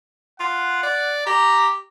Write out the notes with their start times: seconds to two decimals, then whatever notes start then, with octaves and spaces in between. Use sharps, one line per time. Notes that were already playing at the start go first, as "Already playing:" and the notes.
0.40 F4 F#5
0.83 D5
1.26 G4 A#5